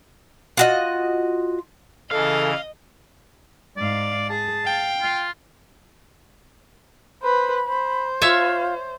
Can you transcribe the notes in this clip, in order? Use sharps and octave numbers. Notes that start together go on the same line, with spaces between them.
F4 F#4 D#5
C#3 E3 A4 D#5 F5
G#2 D5 F5
G#4 A5
F5 G5
F4
B4 C5 B5
C5
F4 C#5 E5 F5 A5